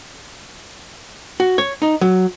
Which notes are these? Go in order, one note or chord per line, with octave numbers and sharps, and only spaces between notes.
F#4
C#5
D#4
F#3